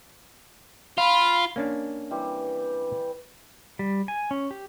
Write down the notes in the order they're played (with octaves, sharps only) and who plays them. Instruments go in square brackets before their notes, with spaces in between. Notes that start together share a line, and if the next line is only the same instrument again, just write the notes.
[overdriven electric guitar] F4 [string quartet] B5
[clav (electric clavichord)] A#3 C#4 D4
[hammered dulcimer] E3 G3 C4
[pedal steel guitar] G3
G#5
C#4
G4